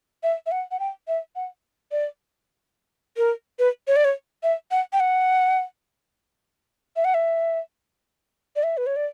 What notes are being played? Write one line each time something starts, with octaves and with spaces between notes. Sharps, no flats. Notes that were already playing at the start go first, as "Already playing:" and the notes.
E5
E5
F#5
F#5
G5
E5
F#5
D5
A#4
B4
C#5
D5
C#5
E5
F#5
G5
F#5
E5
F#5
E5
D5
E5
B4
C#5
D5